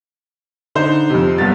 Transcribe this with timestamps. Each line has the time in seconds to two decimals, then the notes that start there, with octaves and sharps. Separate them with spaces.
0.75 D3 D#4 C5
1.10 F2 C3
1.38 F#1 G2 B3 A6